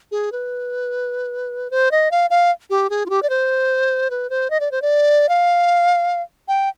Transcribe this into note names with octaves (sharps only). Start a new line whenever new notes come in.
G#4
B4
C5
D#5
F5
F5
G4
G#4
F4
G4
D5
C5
B4
C5
D#5
D5
C5
D5
F5
G5